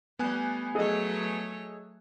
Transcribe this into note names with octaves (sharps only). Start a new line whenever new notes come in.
G3 A3 B3 G#5 F#6
F#3 A3 G#4 A4 C#5 D#5